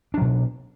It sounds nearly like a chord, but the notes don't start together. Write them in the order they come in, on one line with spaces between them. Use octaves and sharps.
D4 F#3 B2